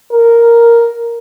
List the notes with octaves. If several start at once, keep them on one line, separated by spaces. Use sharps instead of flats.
A#4